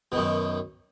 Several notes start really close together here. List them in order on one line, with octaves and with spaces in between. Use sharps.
B2 D#3 F#2